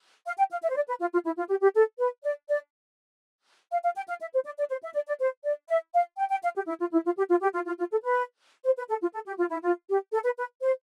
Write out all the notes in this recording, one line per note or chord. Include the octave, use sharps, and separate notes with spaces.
F5
G5
F5
E5
C5
D5
B4
F4
F4
E4
F4
G4
G4
A4
B4
D5
D5
F5
F5
G5
F5
E5
C5
D5
D5
C5
E5
D5
D5
C5
D5
E5
F5
G5
G5
F5
G4
E4
F4
E4
F4
G4
F4
G4
F4
F4
F4
A4
B4
C5
B4
A4
F4
A4
G4
F4
E4
F4
G4
A4
B4
B4
C5